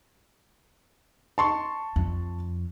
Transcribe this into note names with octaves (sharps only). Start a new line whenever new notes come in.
A5 C6 C#6
F2